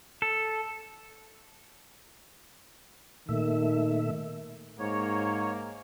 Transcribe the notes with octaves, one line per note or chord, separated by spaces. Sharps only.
A4
A#2 D#3 A3 E5
G#2 A#3 C#5